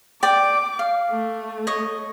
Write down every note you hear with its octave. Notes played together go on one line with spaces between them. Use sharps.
D5 G5 D6
F5
A3
C#5 D#5